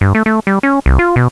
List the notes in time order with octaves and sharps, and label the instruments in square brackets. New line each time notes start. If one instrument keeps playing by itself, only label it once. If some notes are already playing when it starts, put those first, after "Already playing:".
[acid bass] G2
A3
A3
G3
C#4
C2
F4
B2